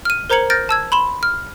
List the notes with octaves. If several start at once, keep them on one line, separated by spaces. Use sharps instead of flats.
F6 D#7
A#4 C5 A#5 G#6 C#7 F#7
F6 G6 A6 A#6 D7
A5 E6 G#6
B5 C6 E7
F6